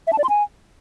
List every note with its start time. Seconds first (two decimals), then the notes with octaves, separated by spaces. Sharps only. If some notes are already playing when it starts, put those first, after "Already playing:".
0.07 E5
0.13 A5
0.18 D5
0.24 C6
0.29 G#5